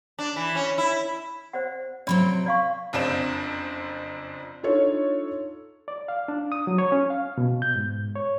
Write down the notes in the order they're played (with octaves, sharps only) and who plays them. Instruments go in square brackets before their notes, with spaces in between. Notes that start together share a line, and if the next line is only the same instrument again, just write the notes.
[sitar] D4
E3
C#4
E4
[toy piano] C5 D5 F#5
[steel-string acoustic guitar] C3 F#3 C4 [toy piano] D5 B5
[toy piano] D5 F5 C#6
[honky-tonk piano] F#1 F2 C4 D4 E7
[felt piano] D4 D#4 F4 A4 C#5
[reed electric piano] D5
F5
D4
D#6
F#3
C#5
C#4
F5
B2
G6
G#2
C#5